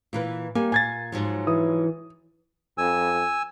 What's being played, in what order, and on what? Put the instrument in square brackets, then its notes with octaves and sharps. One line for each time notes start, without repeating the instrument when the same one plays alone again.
[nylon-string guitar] A#2 E3 B4
[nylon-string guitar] G3 G#5 [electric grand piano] A#3
[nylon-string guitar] A#2 [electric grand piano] G#5 G#6 A6
[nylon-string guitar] G#2 F3 F#3
[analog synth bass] E3 [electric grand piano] D#6
[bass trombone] F2 [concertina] G#5 E6